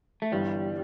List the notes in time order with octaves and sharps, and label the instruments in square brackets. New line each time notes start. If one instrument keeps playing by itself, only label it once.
[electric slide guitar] A3
[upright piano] G1 G2 E3 [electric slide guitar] G3